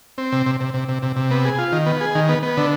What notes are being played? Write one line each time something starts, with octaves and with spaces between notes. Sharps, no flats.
C4
C3
C3
C3
C3
C3
C3
C3
B3
G#4
F4
D#3
B3
G#4
D#3
B3
B3
D3